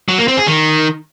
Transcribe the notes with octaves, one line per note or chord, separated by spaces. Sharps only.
F#3
A#3
C4
G#4
D#3